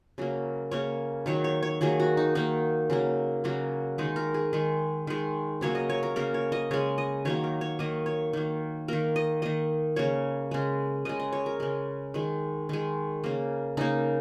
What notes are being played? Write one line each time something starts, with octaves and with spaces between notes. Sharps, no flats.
C#3 F#3 A#3
C#3 A#3 C#5
D#3 F#3 A#3 C#5
C#5
C#5
D#3 F#3 A#3 G#4
F#4
D#4
D#3 A#3 D#4
C#3 F#3 A#3
C#3 F#3 A#3 F#4
D#3 G#3 D#4
A#4
G#4
D#3 G#3
D#3 G#3
C#3 F#3 A#3 C#5
D#5
C#5
A#4
C#3 A#3 A#4
C#5
D#5
C#3 G#3 C#5
D#5
D#3 F#3 A#3 C#5
A#4
C#5
D#3 A#3 D#5
C#5
D#3 A#3
D#3 A#3 A#4
D#5
D#3 A#3 D#5
C#3 A#3 C#5
C#3 G#3
C#3 G#3 D#5
D#5
C#5
A#4
C#3 G#3
D#3 G#3
D#3 G#3
C#3 A#3
C#3 A#3 D#4